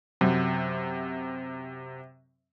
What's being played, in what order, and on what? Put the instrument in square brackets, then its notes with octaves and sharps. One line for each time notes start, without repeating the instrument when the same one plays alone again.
[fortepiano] F#2 [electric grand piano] C3